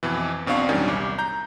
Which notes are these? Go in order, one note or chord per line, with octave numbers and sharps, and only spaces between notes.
F2 B2 E3
B1 B2 C4 D4 F5 C#6
E2 A#2 D#3 F#3 G3 C#4
C2 D6
A#5 G6